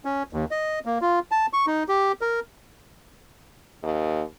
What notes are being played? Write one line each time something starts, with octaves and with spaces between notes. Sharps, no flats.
C#4
D#2
D#5
A#3
F4
A5
C#6
D#4
G4
A#4
D#2